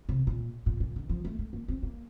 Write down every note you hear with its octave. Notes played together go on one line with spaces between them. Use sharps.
C3
A#2
A#2
A#2
D3
F3
A3
A3
A#3
C4
A#3